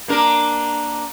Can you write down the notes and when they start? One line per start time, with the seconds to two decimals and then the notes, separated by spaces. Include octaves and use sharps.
0.08 A#3 D4 A#4